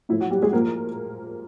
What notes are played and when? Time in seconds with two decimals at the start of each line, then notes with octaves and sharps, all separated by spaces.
0.09 A2 F3 A3 E4
0.20 F#3 F#4
0.31 G3 G4
0.42 G#3 G#4
0.53 A#2 F3 A#3 A#4